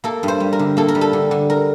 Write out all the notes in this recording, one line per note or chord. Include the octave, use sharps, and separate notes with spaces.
A#3 A4
G2
C5
G3
A#4
D3
A#3 A4
A#4
G3
A4
D3
D3
A#4